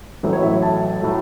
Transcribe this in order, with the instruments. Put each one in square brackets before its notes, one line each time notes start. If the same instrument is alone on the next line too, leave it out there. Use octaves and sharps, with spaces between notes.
[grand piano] A1 A2 F#3 A3 E5
C#5
E5
A5
A2 F#3 A3